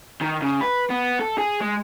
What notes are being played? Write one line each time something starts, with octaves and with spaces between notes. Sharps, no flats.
D#3
C#3
B4
B3
A4
G#4
G#3